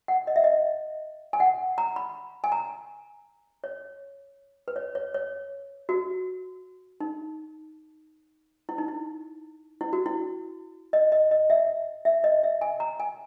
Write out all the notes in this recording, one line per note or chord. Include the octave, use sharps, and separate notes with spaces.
F#5
D#5
E5
D#5
G#5
F#5
A#5
B5
G#5
A#5
C#5
B4
C#5
C#5
C#5
F#4
D#4
E4
D#4
E4
E4
F#4
E4
D#5
D#5
D#5
E5
E5
D#5
E5
G#5
A#5
G#5